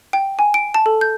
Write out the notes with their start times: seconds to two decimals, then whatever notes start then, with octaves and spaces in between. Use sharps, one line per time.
0.13 G5
0.39 G#5
0.54 D7
0.74 A5
0.86 A4
1.01 G6